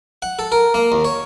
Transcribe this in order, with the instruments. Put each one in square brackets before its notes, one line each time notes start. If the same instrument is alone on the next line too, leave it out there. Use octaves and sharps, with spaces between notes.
[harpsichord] F#5
A4
A#4
A#3
D#2
C#5